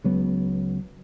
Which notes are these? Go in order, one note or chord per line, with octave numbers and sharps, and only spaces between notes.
C#2 F#3 B3